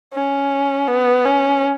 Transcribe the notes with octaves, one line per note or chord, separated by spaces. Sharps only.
C#4
B3
C#4